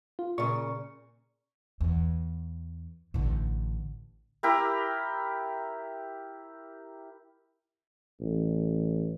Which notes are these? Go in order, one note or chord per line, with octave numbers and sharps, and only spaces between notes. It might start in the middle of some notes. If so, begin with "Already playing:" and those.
F4
A#2 C#3 C#6
E2
A1 D3
E4 G4 A#4
A1